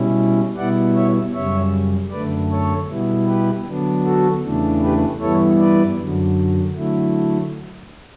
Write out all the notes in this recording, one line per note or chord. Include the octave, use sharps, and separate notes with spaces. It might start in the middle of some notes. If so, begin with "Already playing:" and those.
Already playing: B2 G3 C#4 E4
B2 G3 B3 E4 D5 F#5
C#5 E5
F#2 C#3 G3 C#5 E5
F#2 D3 A3 B4 D5
A4 C#5
B2 G3 B3 E4
G4 B4
D3 F#3 B3 D4
F#4 A4
E2 C#3 E3 A3 D4
G4 B4
G2 E3 G3 B3 E4 A4 C#5
B4 D5
F#2 D3 F#3
D3 F#3 A3 E4